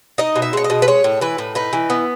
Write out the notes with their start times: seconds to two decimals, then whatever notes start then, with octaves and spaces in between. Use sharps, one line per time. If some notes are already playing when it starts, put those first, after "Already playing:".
0.18 D#4 D#5
0.36 B2
0.42 E5
0.53 G#3 C#5
0.64 D#5
0.70 B2
0.82 B4
0.88 G#3 C#5
1.04 A2
1.21 E3 B4
1.38 A2
1.55 D#4 B4
1.73 E3
1.90 B3